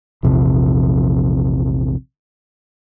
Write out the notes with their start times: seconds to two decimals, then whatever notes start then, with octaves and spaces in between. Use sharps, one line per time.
0.23 A#1 E2 C3 F3